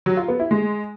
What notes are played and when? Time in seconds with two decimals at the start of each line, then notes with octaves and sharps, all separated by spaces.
0.06 F#3
0.17 F4
0.28 B3
0.40 E4
0.51 G#3